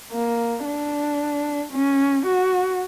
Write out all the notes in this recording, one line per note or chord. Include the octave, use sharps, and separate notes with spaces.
A#3
D4
C#4
F#4